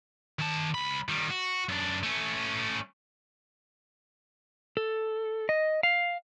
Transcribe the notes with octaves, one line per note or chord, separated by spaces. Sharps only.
D#3 A5
C#2 B5
D#3 G3
F#4
F#2 D4
A3 C#4
A4
D#5
F5